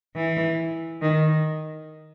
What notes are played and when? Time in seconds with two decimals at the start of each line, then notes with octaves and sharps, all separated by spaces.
0.16 E3
1.02 D#3